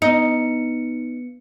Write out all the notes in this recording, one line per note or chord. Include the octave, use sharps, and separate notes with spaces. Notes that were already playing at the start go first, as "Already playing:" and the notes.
B3 D#4 C#7